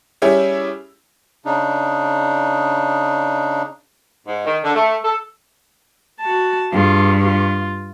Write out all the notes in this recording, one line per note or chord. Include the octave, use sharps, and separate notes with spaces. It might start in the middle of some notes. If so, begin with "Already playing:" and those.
G3 C#4 E4 G4 G#4
C#3 D4 D#4
G#2
D#3
D3
A3
A4
F#4 A5
G2 F4 G#4
F4